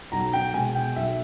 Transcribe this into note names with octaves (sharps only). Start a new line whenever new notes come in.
B1 A#5
G5
B2 G#3 G#5
G5
B1 E5